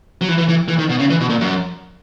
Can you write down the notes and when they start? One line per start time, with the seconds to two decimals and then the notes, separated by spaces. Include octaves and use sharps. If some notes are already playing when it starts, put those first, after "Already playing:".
0.21 F#3
0.28 E3
0.38 E3
0.49 E3
0.68 E3
0.79 D#3
0.90 B2
0.99 C#3
1.10 E3
1.20 B2
1.29 A#2
1.41 F#2